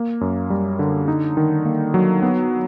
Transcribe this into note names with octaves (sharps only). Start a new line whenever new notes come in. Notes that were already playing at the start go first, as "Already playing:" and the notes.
Already playing: A#3
F#2
G3
D3
D#4
D#3
A#3
F#3
B3